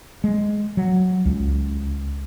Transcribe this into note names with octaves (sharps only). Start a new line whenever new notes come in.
G#3
F#3
C#2